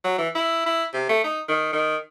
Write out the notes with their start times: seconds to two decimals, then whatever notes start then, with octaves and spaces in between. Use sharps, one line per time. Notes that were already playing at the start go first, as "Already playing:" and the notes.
0.04 F#3
0.18 E3
0.35 E4
0.66 E4
0.94 C3
1.09 A3
1.24 D#4
1.48 D#3
1.73 D#3